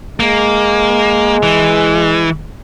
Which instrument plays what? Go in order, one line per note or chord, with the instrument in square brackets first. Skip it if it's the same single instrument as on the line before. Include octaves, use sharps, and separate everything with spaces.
[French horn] G#3 [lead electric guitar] A#3
[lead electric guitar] E3